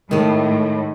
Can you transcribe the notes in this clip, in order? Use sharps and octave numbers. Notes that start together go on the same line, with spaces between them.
A2 D#3 G#3